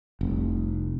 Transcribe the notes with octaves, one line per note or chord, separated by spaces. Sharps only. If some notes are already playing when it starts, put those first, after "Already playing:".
F1 C2